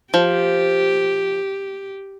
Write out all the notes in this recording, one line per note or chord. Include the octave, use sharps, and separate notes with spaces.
F3 G4